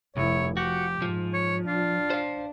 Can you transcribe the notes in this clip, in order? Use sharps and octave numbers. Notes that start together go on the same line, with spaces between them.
F1 C2 E4 C#5
F3 F#4 G4
G#2 F3
C#5
D4 F4
C5 F5